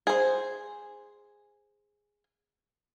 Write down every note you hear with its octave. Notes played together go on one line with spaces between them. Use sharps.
G#4 C5